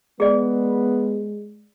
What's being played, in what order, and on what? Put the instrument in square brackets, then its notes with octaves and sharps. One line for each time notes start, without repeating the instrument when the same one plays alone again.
[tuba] G#3 [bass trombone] B3 [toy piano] G#4 D5